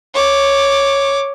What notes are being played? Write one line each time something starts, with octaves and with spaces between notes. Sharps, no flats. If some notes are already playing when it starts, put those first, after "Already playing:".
C#5 D6